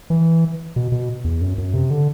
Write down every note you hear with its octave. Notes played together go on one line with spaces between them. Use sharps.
E3
B2
B2
E2
F#2
F#2
C3
D3